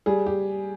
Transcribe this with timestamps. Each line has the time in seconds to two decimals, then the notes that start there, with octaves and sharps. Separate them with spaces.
0.06 G3 G#4
0.26 G4